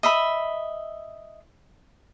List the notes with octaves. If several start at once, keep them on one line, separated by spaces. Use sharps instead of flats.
D#5 E5 B5